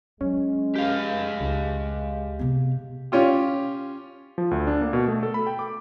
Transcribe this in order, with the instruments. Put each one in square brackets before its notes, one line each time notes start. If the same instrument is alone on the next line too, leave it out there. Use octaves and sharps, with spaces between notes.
[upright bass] F#3 [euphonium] G#3 [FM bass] C#4
[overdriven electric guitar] G4 F5
[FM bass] C#2
[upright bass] C3 B3
[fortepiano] C#4 F4 G4
[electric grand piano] F3
D2
D4
A#3
B2
A3
A4
B5
G5
D6